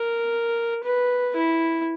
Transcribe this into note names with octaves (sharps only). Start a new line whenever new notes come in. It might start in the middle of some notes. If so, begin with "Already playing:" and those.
Already playing: A#4
B4
E4